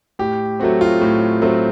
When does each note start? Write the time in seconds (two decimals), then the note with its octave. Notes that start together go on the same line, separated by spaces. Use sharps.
0.19 A2 G4
0.60 F#3 A3 C4 F#4
0.81 F4
1.01 A2
1.42 F#3 A3 C4